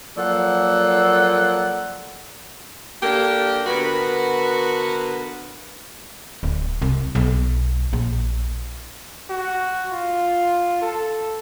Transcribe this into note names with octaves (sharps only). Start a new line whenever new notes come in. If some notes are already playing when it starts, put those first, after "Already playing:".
F3 F#3 A#3 A4 D5 F#5
A#3 D4 G4 A4 A#4
D3 B3 F#4 A#4 B4
D1
C2
B1
A#1
F#4
F4
A4